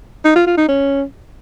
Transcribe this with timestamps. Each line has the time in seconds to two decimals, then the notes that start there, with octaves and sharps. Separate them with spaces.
0.25 D#4
0.36 F4
0.47 F4
0.57 D#4
0.68 C#4